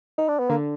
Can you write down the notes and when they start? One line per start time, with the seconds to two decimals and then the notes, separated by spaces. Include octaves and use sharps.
0.18 D#4
0.29 D4
0.39 B3
0.50 D3 A#3